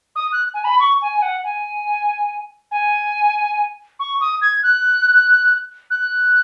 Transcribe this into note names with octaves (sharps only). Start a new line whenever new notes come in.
D#6
F#6
G#5
B5
C#6
G#5
G#5
F#5
G#5
G#5
C#6
D#6
G#6
F#6
F#6